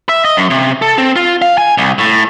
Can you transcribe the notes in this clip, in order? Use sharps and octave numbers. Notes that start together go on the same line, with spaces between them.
E5
D#5
F#2
C3
A4
C4
F4
F5
G#5
C2
A2